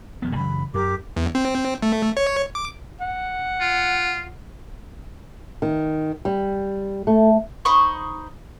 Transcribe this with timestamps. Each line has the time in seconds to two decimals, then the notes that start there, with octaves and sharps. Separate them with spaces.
0.22 E1 F3 B3
0.36 F#2 C#3 E3 B5
0.74 F#2 G4 A#4 D6
1.17 E2
1.35 C4
1.82 A3
2.17 C#5
2.55 D6
3.00 F#5
3.61 F4
5.62 D#3
6.25 G3
7.07 A3
7.65 D#4 C5 B5 C#6